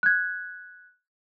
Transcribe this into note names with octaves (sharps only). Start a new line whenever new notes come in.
F#6 G#6